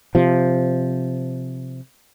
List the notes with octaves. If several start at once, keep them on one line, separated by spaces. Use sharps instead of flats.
C3 F3